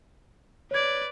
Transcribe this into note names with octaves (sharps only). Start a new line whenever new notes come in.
B4 C#5 D5 G#6